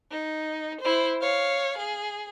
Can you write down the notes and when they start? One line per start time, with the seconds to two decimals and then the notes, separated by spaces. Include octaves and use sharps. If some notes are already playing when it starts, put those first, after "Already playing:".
0.11 D#4
0.81 E4 C5
1.21 C#5 F5
1.78 G#4